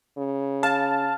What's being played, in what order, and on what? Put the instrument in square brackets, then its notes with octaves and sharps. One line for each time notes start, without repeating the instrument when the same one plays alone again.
[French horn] C#3
[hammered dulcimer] F5 [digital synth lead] A5